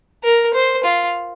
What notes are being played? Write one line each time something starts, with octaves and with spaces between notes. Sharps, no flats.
A#4
C5
F4